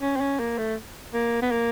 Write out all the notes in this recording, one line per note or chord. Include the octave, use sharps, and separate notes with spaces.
C#4
C4
C#4
A#3
A3
A#3
B3
A#3